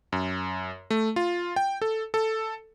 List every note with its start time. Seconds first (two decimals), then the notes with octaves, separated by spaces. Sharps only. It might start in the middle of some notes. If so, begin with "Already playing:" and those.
0.12 F#2
0.90 A3
1.16 F4
1.56 G5
1.82 A4
2.14 A4